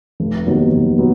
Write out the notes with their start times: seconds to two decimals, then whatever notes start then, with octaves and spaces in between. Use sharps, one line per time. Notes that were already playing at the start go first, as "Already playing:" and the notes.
0.20 F1
0.46 D#2 D#3 F#3 B3
0.71 F1
0.98 F#3 B3